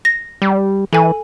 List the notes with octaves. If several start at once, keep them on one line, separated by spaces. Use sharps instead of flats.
A#6
G3
E3 A4 G#5